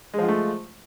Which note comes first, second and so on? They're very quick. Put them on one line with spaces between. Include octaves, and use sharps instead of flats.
G#3 F3 F4 A3